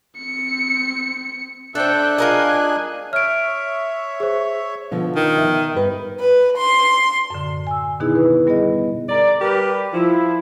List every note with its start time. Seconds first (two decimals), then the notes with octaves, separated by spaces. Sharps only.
0.19 C4 C#7
1.75 D4 A4 C5 E5 G5 F#6
2.18 F4 G#4 A#4 D#5 G#5
3.13 C#5 E5 F6 D7
4.20 G#4 C5
4.91 B2 D3 F3
5.16 D#3
5.38 E5
5.74 G2 B4
6.20 B4
6.57 C6
7.30 F#2 A2 D3
7.67 G#5 E6
8.00 B2 D#3 B3 D#4 E4 G#4
8.15 B4
8.47 G3 B3 G#4 D#5
9.09 A#4 D5
9.40 G3 G4 A#4 B4
9.93 F3 E4